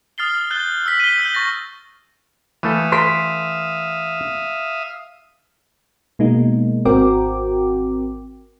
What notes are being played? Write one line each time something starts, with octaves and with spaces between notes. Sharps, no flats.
D#6 F6 A6 C7 G7
F#6 G6 A6 G7
E6 B6
D#7 G7
E6 G6 B6 G7
C#6 A6 A#6
E3 A3 A4 E5 F5 D#6
C6 B6 D7
B2 G#3 A#3 D#4
G#1 C4 F#4 A#4 G5 D6